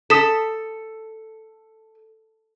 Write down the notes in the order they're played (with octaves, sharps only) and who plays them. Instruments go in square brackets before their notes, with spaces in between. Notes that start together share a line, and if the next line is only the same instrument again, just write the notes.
[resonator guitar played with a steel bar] A4 [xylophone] D#6 B6 E7